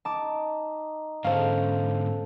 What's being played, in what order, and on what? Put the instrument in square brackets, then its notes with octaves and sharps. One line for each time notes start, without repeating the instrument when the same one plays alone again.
[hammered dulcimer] D#4 [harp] A5 D6
[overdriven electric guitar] G#2 D3 [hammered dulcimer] C#4 A4 [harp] C5 F5